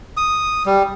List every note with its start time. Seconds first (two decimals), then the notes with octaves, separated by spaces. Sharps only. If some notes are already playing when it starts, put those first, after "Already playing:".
0.17 D#6
0.66 G3